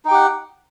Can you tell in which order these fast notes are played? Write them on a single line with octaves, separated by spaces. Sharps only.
D#4 G5 G4 F#5